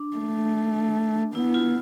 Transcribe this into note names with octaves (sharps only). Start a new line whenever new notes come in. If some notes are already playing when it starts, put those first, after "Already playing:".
Already playing: D4
A3
B3 E4
F4